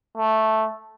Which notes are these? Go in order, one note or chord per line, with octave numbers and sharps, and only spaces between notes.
A3